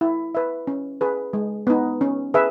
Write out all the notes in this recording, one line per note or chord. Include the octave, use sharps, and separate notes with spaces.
E4
B4 E5
C#4
G#4 B4
G#3
B3 D#4
C#4
G#4 B4 E5